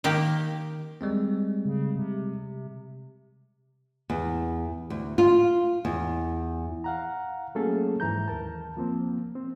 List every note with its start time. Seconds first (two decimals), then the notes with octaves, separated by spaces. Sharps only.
0.04 D#3 A#3 G4
1.01 G3 G#3 C4
1.65 C#3
1.95 C3
4.10 E2
4.90 D2
5.18 F4
5.85 E2
6.84 F5 F#5 A#5
7.55 F#3 A3 A#3 C#4 G#4 A4
8.00 G#2 E3 A#5 G6
8.28 D#2 A#4 A5
8.77 F3 A#3 C4
9.35 C4